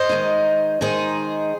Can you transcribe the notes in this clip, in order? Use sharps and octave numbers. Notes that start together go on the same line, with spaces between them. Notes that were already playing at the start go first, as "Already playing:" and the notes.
Already playing: C5 D#5
D#3 G#3 D#4
D#3 G#3 D#4 G#4 C5